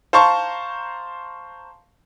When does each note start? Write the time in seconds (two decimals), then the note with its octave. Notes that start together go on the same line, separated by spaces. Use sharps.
0.13 C5 F5 A5 A#5 C6 C#6